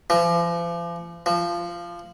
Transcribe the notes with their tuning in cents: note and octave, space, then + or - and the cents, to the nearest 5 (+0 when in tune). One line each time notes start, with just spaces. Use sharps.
F3 -40
F3 -15